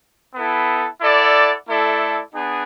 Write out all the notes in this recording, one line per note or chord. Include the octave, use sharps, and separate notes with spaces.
B3 E4 A4
E4 A4 D5 F#5
A3 E4 A4 D5
B3 D4 G#4